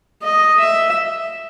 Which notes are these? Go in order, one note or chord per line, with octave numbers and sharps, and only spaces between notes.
D#5
E5